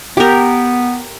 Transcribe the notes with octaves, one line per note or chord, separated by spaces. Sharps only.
B3 G4 A#4